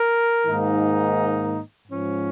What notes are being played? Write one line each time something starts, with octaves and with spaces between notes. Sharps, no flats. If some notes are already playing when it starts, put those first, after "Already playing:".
Already playing: A#4
G#2 D#3 A#3 D#4
G#2 F3 C#4